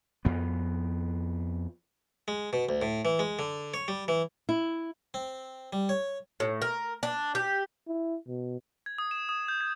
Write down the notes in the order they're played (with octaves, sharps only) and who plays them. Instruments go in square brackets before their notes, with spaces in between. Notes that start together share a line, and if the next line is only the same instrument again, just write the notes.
[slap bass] F2 B3
[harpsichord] G#3
B2
D2
A2
E3
G#3
D3
C#5
G3
E3
[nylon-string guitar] E4
[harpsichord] C4
G3
C#5
[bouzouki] A2
A#4
D4
G4
[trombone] E4
B2
[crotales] G#6
D#6
E7
D#6
G6
G#6